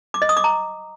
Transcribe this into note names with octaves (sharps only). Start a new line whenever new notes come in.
D6
D#5
D#6
D6
A#5